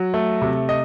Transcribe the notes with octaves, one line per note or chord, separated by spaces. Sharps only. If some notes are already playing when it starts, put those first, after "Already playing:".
Already playing: F#3
A3
C3
D#5